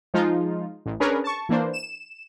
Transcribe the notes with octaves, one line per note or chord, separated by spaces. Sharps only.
F3 G#3 D#4 F4
A1
C#4 D4 G#4 A#4 B4 C#5
A5 C#6
E3 A#3 D4 C5
E7